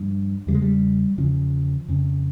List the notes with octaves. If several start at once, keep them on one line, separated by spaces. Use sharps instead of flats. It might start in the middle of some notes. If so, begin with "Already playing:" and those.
Already playing: G2 F3
E2 C#3 G3
G#3
G3
E2 C#3 F3
F2 C#3